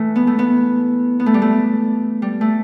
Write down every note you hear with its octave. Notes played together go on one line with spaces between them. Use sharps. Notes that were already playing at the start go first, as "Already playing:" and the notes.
Already playing: E3 A3
B3
A3
B3
B3
A3
G3
A3
G3
A3